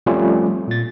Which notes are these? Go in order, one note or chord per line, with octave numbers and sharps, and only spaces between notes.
F3 G3 A3 C4 C#4 F4
A#2 A6